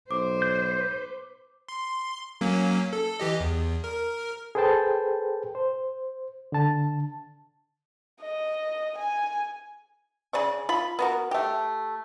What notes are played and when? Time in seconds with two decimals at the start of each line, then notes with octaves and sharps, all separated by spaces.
0.11 B1 C5 D6
0.42 G6
1.68 C6
2.41 F#3 A#3 C#4
2.93 A4
3.20 E3 G4 D#5
3.40 E2
3.84 A#4
4.55 G#4 A4 B4 C5 G5 A5
5.55 C5
6.52 D3 A5
8.21 D#5
8.98 G#5
10.33 C#3 D5 C#6
10.69 F4 B5
10.99 B3 F#4 A#4
11.31 A3 G4